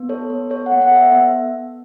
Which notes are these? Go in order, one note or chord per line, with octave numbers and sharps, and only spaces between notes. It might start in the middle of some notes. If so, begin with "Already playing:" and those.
Already playing: B3
A4 C#5
B3
A4 C#5
F#5
B3
F#5
A4 E5
B3 E5